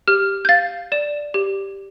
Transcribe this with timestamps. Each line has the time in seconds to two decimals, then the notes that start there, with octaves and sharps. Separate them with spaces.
0.08 G4 F6
0.45 G6
0.49 F5 A6
0.92 D5 E7
1.34 G4